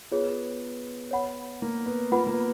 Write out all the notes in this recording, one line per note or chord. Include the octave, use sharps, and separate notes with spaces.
B3 F4 G#4 C#5
C#5 F#5 B5
A#3
B3
A#3 F4 B4 F#5 B5
B3
A#3
B3